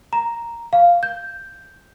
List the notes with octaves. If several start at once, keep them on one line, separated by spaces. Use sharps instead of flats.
A#5
F5
G6